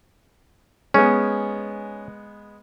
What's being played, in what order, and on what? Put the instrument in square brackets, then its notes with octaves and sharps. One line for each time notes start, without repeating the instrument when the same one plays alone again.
[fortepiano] G#3 B3 [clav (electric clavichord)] C#4